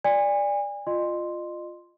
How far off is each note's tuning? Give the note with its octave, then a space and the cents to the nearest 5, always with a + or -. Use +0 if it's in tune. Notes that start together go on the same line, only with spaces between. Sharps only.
D5 +0 G#5 -35
F4 +0 D#5 -35 C6 +0